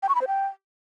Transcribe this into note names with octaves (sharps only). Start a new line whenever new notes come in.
G5
C#6
B5
C5
G5